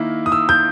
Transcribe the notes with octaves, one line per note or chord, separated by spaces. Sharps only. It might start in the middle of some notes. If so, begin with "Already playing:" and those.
Already playing: D#3 A#3 E4
D#6
E6
G6